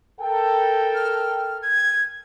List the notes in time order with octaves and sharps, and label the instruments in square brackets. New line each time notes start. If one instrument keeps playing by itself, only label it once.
[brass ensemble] A4 A#4 G5
[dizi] F6
G#6